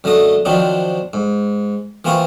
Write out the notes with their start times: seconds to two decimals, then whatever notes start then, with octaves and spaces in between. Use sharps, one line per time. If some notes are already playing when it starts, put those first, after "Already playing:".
0.04 F#2 D3 A3 D#5 D#6
0.45 D#3 F3 F#3 C4 D4 D#4
1.13 G#2
2.05 E3 A#3 C4 F4 C#6 D#6